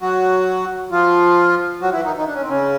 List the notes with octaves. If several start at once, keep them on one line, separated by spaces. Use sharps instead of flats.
F#3 F#4
F3 F4
F#3 F#4
E3 E4
D#3 D#4
D#3 D#4
D4
C#4
C4
C#3 C#4